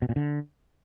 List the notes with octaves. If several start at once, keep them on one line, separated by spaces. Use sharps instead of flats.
B2
A#2
D3